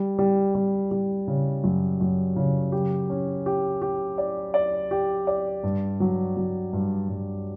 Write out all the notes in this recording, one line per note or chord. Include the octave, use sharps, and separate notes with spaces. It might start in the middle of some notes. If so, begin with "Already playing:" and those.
Already playing: G3
G3
G3
G3
C#3
F#2
F#2
C#3
G4
C#4
G4
G4
D5
D5
G4
D5
G2
F#3
F#3
G2
G2